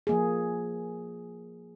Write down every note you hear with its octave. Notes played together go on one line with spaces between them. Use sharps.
F3 A#3 G#4